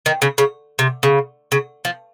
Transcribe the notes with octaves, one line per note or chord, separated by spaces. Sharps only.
D#3
C#3
C#3
C3
C#3
C#3
F3